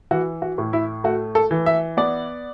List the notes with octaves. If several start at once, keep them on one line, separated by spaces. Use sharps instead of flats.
E3 F#4
F#4
A2
E4
A3 F#4
A4
E3
E5
B3 D5